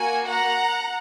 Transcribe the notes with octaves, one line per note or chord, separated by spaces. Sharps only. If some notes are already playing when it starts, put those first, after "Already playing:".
Already playing: A#3 F#4 G#5
F#5 A#5